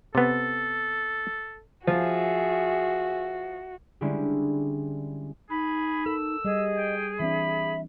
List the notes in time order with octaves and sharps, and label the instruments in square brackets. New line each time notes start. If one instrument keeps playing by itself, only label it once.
[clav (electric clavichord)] C3 B3 [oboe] A4
[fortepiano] F3 [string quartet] F#4 [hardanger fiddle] G#4 E5
[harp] D3 G3 G#3 C#4 D4 E4
[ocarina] D#4 [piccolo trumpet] G#4 [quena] B5
[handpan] A4 A#4 [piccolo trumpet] E6
[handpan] G3 [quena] G#4 [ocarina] D#5
[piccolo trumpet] G5
[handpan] E3 C4 D4 [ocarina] E5 [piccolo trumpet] B5